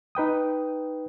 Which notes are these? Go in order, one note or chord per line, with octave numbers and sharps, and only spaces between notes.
D#4 B4 G5 D#6